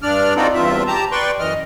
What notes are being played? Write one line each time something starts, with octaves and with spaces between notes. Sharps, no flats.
G2 D4 D5 F6
C4 D#4 F4 F#4 A4 D5
E2 G2 C4 F4 E5
G4 A5 A#5
B4 D5 G5 C6 C#6
F#2 E3 D#5 F6